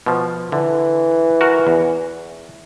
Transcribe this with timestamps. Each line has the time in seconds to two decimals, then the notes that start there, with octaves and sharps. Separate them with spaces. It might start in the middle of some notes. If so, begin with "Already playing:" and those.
0.06 B2 F3
0.52 D3 E3
1.41 F#4 A#4
1.67 E2